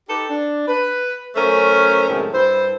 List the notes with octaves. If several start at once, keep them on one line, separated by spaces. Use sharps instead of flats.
D#4 G4 A4 B4
D4
B4
F#2 A3 C#4 A#4 C5
F#2 A2 C3 D#3 G#3
G2 E4 C5